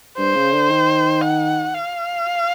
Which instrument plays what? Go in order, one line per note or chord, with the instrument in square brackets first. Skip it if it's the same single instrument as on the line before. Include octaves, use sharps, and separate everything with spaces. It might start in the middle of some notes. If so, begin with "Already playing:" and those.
[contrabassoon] G2 [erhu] C5
[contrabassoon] C#3
D3
D#3
[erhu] F#5
F5